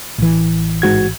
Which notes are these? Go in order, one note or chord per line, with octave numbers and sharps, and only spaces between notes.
A1 E3
G#2 F#4 G#6